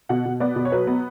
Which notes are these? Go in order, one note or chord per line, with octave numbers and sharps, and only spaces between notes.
B2 F#5
B2
B3 D5
B2
C#5
F#3 B4
B3